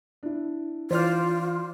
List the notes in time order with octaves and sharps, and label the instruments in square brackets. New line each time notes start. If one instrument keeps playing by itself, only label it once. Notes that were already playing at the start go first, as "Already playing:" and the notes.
[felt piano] D4 E4
[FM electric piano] E3 F6 [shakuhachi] F4 [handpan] C5 D5